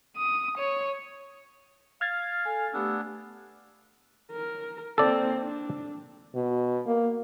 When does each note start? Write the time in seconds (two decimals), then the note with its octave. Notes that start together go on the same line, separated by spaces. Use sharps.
0.17 D#6
0.58 C#5
2.01 F5 F6 G#6 A6
2.45 A4 G#5
2.73 A3 B3 D4 G4 E6
4.32 A#4
4.98 A#3 C4 A4 D5
5.41 D4
6.35 B2
6.86 A#3